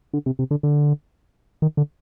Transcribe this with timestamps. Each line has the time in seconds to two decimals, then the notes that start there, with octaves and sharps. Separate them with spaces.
0.13 D3
0.26 C3
0.39 C3
0.51 D3
0.63 D3
1.62 D#3
1.77 D3